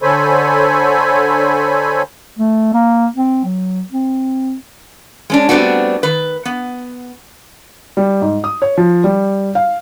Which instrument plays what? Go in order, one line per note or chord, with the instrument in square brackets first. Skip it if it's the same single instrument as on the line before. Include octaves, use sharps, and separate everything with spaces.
[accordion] D3 A4 C5 C#5 G#5 B5
[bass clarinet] A3
A#3
C4
F#3
C4
[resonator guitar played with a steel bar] G#3 C#4 D4
G3 A3 B3 C4 D4 F#4
D#3 B4
B3
[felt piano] G3
G#2
D#6
C#5
F3
G3
F5